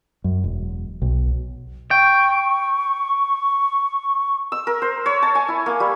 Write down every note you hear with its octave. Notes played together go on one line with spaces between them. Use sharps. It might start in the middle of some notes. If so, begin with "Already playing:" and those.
F#2
E1
B1
G5 C#6
E6
A#4
C5
C#5
A5
G#5
E4
A#3
G3